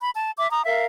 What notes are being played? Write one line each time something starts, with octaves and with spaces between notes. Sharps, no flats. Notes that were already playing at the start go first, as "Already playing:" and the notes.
B5
A5
E5 D6
A#5 D#6
A#4 E5 F5